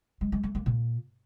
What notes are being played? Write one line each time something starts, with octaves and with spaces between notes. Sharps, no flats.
G#3
G#3
A3
A#3
A#2